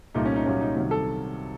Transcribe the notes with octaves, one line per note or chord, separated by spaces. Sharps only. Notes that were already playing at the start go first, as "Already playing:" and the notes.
C2 A#2 A3 D#4
C#4
D#4
C2 A#2 F#3 C#4
D#4
C2 C3 D#3 F#3
A4